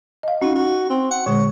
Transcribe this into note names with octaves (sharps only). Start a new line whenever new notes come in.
D#5 F5
C#4 D#4 F#4
F#4
C4
F#5
A#2 D3 G#3 C#5